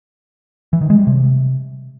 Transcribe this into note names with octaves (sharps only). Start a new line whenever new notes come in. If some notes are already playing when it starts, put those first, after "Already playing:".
E3
D#3
G#3
G3
C3